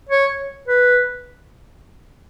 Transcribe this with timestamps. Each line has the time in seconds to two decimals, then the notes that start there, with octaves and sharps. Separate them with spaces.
0.09 C#5
0.68 B4